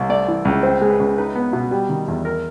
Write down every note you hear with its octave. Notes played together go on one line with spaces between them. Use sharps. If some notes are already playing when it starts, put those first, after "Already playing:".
Already playing: C2
A3 D5
E3
C#2
C4 C5
G#3
B4
C#2
D#4 B4
B3
B2
G3
D#3
E2
A#4